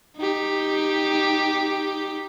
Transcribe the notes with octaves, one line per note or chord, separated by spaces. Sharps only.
D#4 G4